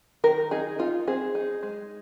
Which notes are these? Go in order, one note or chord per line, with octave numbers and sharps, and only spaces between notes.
D#3 A#4
D#4 G#4
D#4 F4
C4 G#4
D#4
G#3